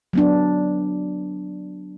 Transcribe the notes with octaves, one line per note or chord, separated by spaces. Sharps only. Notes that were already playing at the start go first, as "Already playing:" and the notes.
F#3 B3 D4